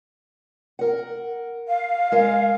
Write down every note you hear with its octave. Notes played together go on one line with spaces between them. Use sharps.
A#4 F#5
F5
G#3 A#4